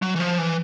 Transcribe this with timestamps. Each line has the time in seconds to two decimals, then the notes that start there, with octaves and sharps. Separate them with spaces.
0.02 F#3
0.16 E3
0.20 F3
0.38 E3